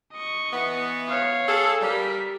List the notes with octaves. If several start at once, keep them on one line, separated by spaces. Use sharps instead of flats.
D#5 C#6
E3 B3
C#5 F5
G#4 A4
G3 A#4 B6